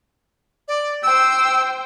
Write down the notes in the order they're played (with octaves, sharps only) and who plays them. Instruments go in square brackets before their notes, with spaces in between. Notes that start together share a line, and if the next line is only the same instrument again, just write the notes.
[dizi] D5
[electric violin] C5 G5 [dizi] E6